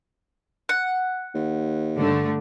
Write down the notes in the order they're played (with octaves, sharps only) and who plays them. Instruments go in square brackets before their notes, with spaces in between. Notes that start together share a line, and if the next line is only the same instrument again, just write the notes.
[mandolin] F#5
[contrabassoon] D#2
[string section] G2 D3 A3